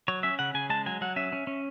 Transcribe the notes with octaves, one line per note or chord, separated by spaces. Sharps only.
F#3 C#5
C#4 E5
C#3 F#5
C#3 G#5
G#3 A5
F#3 G#5
F#3 F#5
C#4 E5
C#4
C#4